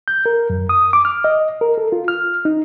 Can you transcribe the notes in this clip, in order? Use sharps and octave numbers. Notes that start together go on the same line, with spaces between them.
G6
A#4
F#2
D#6
D6
F6
D#5
A#4
A4
F4
F6
D#4